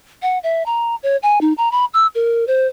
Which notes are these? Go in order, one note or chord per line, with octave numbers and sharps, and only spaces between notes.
F#5
E5
A#5
C#5
G#5
D#4
A#5
B5
E6
A#4
C5